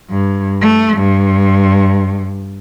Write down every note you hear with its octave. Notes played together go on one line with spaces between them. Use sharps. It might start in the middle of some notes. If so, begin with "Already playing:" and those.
G2
A3
G2